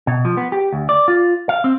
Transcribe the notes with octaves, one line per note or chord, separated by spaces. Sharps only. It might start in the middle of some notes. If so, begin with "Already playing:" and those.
B2
F3
B3
G4
D2
D5
F4
F5
C4